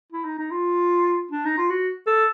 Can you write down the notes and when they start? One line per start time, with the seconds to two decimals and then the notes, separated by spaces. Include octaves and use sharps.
0.12 E4
0.25 D#4
0.38 D#4
0.51 F4
1.31 D4
1.45 D#4
1.58 F4
1.70 F#4
2.07 A4